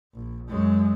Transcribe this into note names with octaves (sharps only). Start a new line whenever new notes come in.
A#1
F#2 G#3